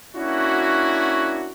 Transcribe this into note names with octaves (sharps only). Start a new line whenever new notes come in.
A#3 C#4 D4 E4 F#4